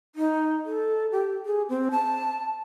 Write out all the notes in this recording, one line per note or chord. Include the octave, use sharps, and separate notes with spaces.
D#4
A4
G4
G#4
C4
A5